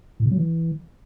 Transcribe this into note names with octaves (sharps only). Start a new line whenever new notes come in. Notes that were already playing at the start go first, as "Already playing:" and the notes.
A2
C3
F#3
E3